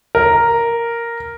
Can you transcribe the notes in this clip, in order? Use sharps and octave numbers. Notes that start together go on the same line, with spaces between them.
A#4